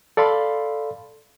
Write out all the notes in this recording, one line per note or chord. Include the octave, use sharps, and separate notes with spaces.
A4 D5 F5 B5 C6